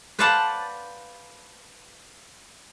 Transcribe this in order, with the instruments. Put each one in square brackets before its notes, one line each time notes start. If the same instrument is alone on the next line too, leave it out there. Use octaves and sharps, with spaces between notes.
[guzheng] B4 C5 D5 F5 F#5 A5